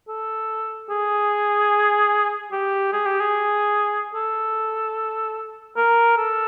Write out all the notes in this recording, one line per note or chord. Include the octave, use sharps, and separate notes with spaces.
A4
G#4
G4
G#4
G4
G#4
A4
A#4
A4